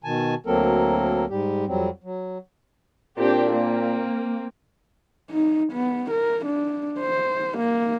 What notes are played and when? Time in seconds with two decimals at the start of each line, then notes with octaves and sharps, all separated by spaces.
0.04 B2 D#3 G#5 A5
0.46 D2 F#3 A#3 C4 A4 A#4
1.29 G#2 G3 G4
1.67 F2 F#3 G3 C4
2.04 F#3
3.17 A#2 C4 D4 G4
3.52 A#3 C4
5.30 D#4
5.72 B3
6.10 A#4
6.45 D4
7.00 C5
7.57 A#3